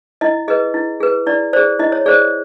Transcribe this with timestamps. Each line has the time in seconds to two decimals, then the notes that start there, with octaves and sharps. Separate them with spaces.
0.21 E4 D#5
0.48 G#4 B4 D#5
0.74 E4
1.00 G#4 B4
1.26 E4 D5
1.53 C5 D5
1.57 G#4
1.79 E4 D#5
1.92 C#5
2.06 G#4 C5 D5